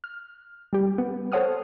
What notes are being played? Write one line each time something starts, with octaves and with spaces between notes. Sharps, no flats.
F6
G3 G4
B3
A4 C5 C#5 F#5 D#6 F6